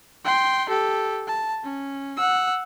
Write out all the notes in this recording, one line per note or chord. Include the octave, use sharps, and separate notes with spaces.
G5 C6
G4 A4
A5
C#4
F#5 E6